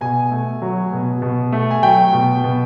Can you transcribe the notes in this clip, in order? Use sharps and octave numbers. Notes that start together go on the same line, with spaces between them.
B2 G#5
A3
F#3
B2
B2
A3
G#5
F#3 G5
B2
B2